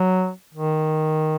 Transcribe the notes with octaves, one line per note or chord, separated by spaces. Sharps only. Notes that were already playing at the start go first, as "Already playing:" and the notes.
Already playing: F#3
D#3